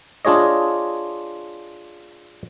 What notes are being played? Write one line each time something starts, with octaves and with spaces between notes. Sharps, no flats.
D4 F4 G#4 C#5 D#5